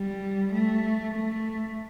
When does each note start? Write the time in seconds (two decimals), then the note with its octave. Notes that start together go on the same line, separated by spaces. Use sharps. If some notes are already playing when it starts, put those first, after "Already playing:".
Already playing: G3
0.53 A3
1.14 A3